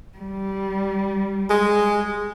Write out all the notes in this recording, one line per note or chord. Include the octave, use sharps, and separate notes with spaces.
G3
G#3